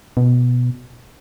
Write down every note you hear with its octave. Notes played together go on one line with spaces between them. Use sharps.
B2